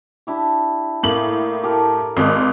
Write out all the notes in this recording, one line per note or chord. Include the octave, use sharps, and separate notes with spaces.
D4 E4 G4
A2 A#3 F#7
G4 A4 A#4
G#1 G#3 A#5